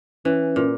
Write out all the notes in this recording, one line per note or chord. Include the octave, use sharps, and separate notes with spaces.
E3 C#4
A#2